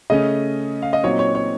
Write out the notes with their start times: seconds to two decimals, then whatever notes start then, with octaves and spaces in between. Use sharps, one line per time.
0.10 C#3 A3 C#4 D#5
0.82 F5
0.93 D#5
1.03 A#2 F#3 C4 D#4 C#5
1.19 C#5
1.35 C#5